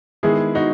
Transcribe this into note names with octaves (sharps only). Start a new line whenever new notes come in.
D#3 G#3 B3 E4 G#4
D#4 F#4